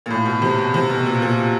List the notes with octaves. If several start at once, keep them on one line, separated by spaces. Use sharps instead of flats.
A#2
A2
B2
C3
B2
C3
B2
A#2
A#2